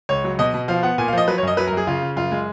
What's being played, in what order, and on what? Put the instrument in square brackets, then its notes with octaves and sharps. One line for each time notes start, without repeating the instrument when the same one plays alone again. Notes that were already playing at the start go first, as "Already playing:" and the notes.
[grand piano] C#2 C#5
F#3
B2 D#5
B2
F3 F5
B3 F#5
A#2 G#5
F5
F3 D#5
F#3 B4
C#5
F#2 D#5
F#3 B4
A#4
F#2
G#4
C#3 F4
C#3
F#2 F4
G#3